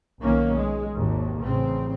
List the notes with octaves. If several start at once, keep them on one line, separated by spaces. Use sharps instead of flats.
B1 D#3 A#3 C#4
G#3
G#1 D#2
A1 C#3 C4